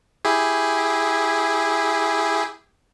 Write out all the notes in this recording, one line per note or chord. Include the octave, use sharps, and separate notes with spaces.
E4 G4 G#4